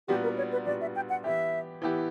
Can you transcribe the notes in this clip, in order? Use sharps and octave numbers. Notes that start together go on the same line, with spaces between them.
A#2 G3 B3 D4 F#4 G4
A#4
C#5
B4
A#2 G3 B3 D4 F#4 D5
E5
G5
F#5
E3 B3 E4 G4 E5
E3 B3 E4 G4